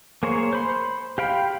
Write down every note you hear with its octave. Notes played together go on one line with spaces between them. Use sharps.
A#3 G#4 C5 C#5
C5 B5 C6
G4 F5 G5 B5